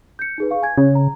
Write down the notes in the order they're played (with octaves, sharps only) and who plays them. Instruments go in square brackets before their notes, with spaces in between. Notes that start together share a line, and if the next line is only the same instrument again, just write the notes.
[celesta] G6 C#7
D#4 G#4 B4
F5 C#6
G#5 G#6
[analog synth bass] C#3 [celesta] C#5
[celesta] A#5